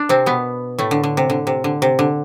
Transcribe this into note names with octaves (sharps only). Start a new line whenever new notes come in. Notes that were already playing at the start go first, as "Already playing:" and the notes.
Already playing: D4
C3 C4
B2 B3
A2 A3
D3
D3
C3
D3
C3
D3
C3
D3